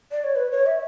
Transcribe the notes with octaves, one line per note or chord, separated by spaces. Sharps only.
D5
C#5
B4
C#5
E5